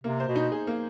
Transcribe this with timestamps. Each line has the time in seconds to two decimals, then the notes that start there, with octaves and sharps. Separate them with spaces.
0.03 C3 A#3
0.20 C5
0.28 B2
0.36 D#4
0.52 G#4
0.67 A#3